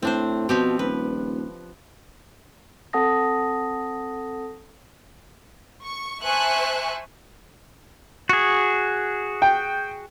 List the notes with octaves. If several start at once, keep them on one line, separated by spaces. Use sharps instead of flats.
A2 C4 D4 C5
B2 F3 C4 G4
D#1 B4
C4 A4 F#5 A5 D#6 A#6
C#6
C5 E5 G#5 A5 C#6 F#6
F#4 G#4
G5